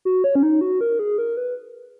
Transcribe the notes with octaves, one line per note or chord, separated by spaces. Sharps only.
F#4
C#5
C#4
D#4
F#4
A#4
G#4
A#4
B4